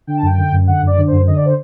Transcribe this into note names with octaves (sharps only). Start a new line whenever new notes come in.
D3 G5
A5
F#2 G5
D3
F#2
D3 F#5
F#2 D5
D3
F#2 C5
D3 D#5
D5
C5